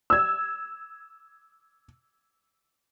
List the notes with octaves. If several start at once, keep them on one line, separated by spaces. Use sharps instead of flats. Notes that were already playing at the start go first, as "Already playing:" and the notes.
E6 G#6